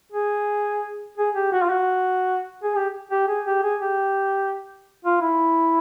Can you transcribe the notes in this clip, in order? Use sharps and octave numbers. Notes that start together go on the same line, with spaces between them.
G#4
G#4
G4
F#4
F4
F#4
G#4
G4
G4
G#4
G4
G#4
G4
F4
E4